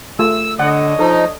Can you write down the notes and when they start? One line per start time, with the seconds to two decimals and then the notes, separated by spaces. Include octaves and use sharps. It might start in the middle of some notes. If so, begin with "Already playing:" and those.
0.19 A3 F4 G#4 E6
0.59 D3 D4 C#5 D#5 F#5
0.99 F3 D#4 A4